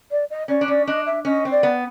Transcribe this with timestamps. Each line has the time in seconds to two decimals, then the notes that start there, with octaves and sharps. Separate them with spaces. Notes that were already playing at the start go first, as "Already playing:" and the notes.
0.11 D5
0.30 D#5
0.48 C#4 D5
0.61 D4
0.68 C#4 D5
0.87 D4 D#5
1.06 E5
1.25 C#4 D#5
1.45 C4
1.51 D5
1.63 B3